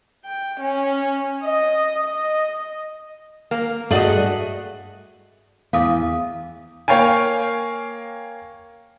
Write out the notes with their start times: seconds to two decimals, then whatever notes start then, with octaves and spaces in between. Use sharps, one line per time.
0.25 G5
0.61 C#4
1.43 D#5
2.05 D#5
3.51 A#3
3.91 G2 A3 F#4 G#4 D5 D#5
5.73 E2 F5 D6 D#6
6.88 A#3 C#5 F5 G5 G#5